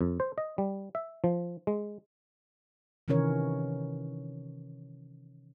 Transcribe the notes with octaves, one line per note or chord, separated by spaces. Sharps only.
F2
C5
D#5
G3
E5
F3
G#3
C3 D#3 E3 C#4 A#4 C#5